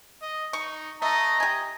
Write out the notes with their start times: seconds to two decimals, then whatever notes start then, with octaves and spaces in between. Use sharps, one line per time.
0.22 D#5
0.53 D#4 C#6
1.02 A3 D#5 A#5
1.40 G4 D#5 G#5